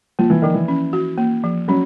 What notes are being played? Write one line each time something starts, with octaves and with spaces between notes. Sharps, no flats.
F3 A#3
E3
D#3 F3
E3
C#4
F#4
A#3
F3
F#3 C#4